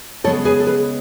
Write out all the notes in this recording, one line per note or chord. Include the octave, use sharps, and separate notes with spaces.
C#3 G#3 B3 A4 C#5
G#4 B4
A4
G#4 B4